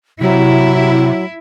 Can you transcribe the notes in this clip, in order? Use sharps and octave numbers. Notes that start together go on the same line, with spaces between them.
C3 F#3 E4